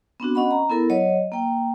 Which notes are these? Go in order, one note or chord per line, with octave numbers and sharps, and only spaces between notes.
B3 C4 D4 F#4
C#4 D#5 F#5 B5
A#5
B3 E4 A4 A#4
F#3 C#5 D#5
A#3 G5